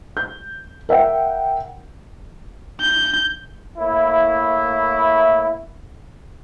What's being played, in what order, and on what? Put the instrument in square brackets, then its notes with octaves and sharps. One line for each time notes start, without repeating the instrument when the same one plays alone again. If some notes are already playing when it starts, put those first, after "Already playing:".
[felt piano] G6
A#4 E5 F#5 G5
[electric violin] G6
[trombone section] A2 A#3 E4